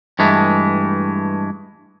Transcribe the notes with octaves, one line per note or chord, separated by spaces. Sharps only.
G2 E3 G#3 A3